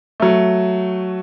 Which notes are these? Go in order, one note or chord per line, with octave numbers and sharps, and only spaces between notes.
F#3 A3